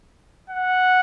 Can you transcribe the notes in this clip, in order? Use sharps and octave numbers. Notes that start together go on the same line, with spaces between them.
F#5